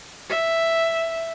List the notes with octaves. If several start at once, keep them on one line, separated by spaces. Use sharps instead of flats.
E5